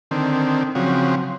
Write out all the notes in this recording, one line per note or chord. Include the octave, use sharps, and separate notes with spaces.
D3 D#3 C4
C#3 F3 F#3 C4